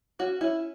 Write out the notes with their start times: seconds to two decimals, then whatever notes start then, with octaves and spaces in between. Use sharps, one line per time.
0.19 C#4 F#4
0.41 C#4 E4